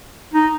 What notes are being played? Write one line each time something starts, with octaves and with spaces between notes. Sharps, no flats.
D#4